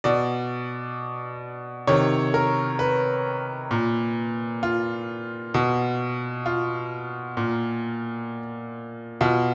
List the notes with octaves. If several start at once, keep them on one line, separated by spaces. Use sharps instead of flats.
B2 D5
C3 D#3 C#5
A#4
B4
A#2
F4
B2
F4
A#2
B2 F4